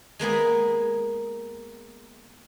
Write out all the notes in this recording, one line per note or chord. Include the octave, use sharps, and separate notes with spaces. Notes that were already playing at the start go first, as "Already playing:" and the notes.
G#3 A#3 B3 G#4